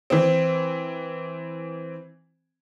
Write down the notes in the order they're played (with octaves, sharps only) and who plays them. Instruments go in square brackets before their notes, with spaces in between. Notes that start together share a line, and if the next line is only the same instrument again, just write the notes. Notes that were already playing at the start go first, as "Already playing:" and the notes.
[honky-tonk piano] E3 C4